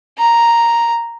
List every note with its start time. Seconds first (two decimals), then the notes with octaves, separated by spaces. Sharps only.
0.18 A#5